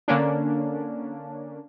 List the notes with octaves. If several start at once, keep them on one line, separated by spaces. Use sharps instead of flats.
D3 A#3 C#4 D4